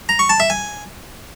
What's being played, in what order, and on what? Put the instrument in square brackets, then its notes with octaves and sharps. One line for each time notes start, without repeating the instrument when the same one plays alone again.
[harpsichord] A#5
C#6
A5
E5
G#5